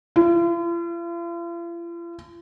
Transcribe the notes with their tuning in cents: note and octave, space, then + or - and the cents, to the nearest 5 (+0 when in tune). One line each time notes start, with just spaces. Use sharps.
F4 -45